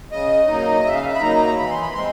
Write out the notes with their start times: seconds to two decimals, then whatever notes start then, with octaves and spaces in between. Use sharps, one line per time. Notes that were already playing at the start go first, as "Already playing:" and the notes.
0.12 C#3 D#5
0.48 F#3 A#3 D#4
0.84 C#3 E5
0.95 F5
1.05 E5
1.15 B5
1.21 F#3 A#3 D#4 A#5
1.58 E3 B5
1.70 C6
1.82 B5
1.94 G#3 C4 C6